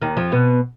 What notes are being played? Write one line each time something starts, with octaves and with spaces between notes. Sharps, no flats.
D#2 D#3
F2 F3
B2 B3